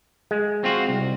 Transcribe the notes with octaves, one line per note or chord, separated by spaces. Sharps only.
G#3
C4 F4 F#4
C2